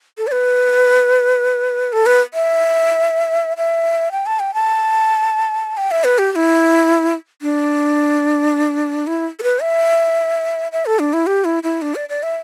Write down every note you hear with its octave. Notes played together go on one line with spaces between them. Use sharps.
A4
D5
B4
A4
B4
E5
E5
G5
A5
G5
A5
G5
E5
B4
G4
G4
E4
D4
E4
A4
B4
E5
E5
A4
D4
E4
G4
E4
E4
D4
D5
D5
E5